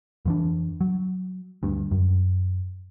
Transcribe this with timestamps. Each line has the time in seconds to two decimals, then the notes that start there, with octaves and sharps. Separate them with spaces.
0.25 F2 E3 D4
0.81 F#3
1.63 D2 G2
1.91 F#2